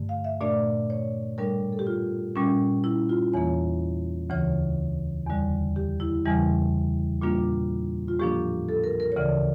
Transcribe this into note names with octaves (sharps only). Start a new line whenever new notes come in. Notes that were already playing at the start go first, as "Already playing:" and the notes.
Already playing: G2 D3 A3
F5
E5
A#2 A3 D4 D5
C#5
A2 G3 D4 A#4
A4
G4
F4
A#2 G3 C#4
E4
F4
E2 E3 A#3 C#5
D2 C#3 E3 C#5
E2 D3 G3
G4
E4
E2 C#3 E3 G3
A#2 G3 A#3 D4 F4
F4
A2 F3 A#3 D4 G4
A4
A#4
A#4
C#5
D2 C#3 E3 D5